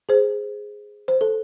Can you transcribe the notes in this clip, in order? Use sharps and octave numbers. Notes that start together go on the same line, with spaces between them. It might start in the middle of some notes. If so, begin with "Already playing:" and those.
G#4 C5
C5
A4